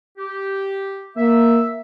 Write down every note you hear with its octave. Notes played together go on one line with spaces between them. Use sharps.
G4
A#3 E5